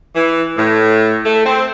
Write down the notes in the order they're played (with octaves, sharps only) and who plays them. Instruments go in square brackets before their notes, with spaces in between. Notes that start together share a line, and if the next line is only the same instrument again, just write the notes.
[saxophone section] E3
A2
A3
C4